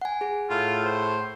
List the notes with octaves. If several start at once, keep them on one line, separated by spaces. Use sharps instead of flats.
F#5 G#5
G#4 F#5
A2 F4
C5